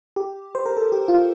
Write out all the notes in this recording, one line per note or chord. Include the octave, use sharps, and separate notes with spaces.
G4
C5
A#4
A4
G4
F4